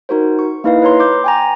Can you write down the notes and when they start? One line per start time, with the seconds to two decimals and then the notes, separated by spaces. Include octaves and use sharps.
0.09 D#4 F#4 A#4 C5
0.39 C#6
0.64 A#3 D#4 E4 B4 D#5 F5
0.82 B4 C#5 A#5 C6
1.00 D6 G6
1.24 G5 G#5 A#5